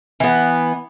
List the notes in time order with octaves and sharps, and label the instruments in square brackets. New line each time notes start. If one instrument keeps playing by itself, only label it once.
[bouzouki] E3 B3